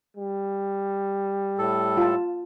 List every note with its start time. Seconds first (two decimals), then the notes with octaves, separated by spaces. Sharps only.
0.17 G3
1.59 A2 A4
1.97 F4 A5